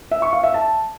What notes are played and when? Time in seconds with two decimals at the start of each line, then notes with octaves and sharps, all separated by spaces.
0.11 E5
0.22 C#6
0.33 F5
0.44 E5
0.54 A5